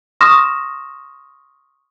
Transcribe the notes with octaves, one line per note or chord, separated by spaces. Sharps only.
C6 C#6 D#6 F6 A#6 E7